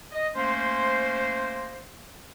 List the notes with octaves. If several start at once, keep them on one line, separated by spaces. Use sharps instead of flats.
D#5
A3 A#3 C#4 C5